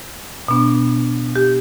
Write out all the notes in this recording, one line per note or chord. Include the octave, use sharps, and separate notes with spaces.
B2 B3 D4
G4